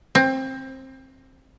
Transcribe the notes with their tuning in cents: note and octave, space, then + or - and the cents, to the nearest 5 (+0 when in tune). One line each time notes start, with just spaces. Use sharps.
C4 +20